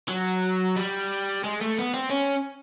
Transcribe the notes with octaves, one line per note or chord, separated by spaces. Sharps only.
F#3
G3
G#3
A3
B3
C4
C#4